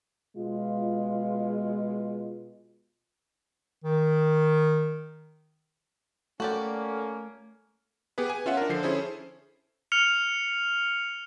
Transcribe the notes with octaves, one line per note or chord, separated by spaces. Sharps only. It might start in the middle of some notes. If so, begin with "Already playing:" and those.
B2 G#3 F4
D#3
A3 A#3 C#4 F#4 G4 A4 D5
B3 G4 G#4 B4
G#5
C#4 F4 E5 F#5
D4 A#4
D3 F3 C7
C#4 E4 G#4 A4 C5
F6 C#7 F7